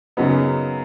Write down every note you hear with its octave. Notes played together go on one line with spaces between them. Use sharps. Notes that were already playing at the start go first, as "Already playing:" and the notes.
F#2 C#3 F#3 B3 D#4